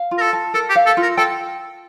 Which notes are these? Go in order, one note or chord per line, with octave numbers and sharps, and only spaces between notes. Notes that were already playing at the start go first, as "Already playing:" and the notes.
Already playing: F5
F4
A#4
A4
A5
A4 A#4
G4
F5
A4
F4
A#4
A4 G5